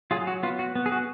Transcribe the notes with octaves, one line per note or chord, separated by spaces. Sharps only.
F#3 F4 G#4
F#4
B3 F4
F#4
B3
G#4
F#4